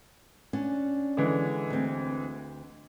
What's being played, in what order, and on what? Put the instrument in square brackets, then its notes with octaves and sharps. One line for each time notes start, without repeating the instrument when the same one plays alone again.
[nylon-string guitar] C#4 D4 F#5
[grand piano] D3 E3 G#3
[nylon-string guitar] D2 C4